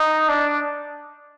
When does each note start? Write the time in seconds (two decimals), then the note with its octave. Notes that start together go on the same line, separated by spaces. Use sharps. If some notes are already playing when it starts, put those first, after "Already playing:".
Already playing: D#4
0.29 D4